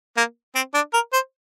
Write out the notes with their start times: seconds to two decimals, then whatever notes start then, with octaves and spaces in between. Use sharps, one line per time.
0.17 A#3
0.55 C4
0.74 D4
0.93 A#4
1.13 C5